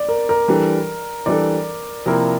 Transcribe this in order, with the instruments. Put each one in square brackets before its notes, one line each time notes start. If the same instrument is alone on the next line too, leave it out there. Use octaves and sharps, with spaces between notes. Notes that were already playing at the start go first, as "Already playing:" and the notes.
Already playing: [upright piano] D5
A#4
A#4
[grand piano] E3 G3 D4 A4
[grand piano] E3 G3 D4 A4 [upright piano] D5
[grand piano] C3 F3 A#3 E4 A#4